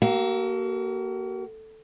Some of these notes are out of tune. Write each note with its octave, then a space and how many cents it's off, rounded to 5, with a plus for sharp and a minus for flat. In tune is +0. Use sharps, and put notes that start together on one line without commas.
A#3 +0 F#4 +45 A4 +0